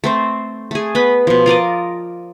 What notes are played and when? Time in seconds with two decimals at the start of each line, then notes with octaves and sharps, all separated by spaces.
0.04 A3 C4 C5
0.71 A3 G#4
0.95 B3 B4 B5
1.27 B2 F3
1.46 F4 A#4 D5 D#5